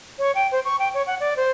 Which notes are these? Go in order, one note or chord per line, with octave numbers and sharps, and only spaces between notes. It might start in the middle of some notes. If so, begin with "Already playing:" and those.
C#5
G5
C5
C#6
G5
C#5
F#5
D5
C5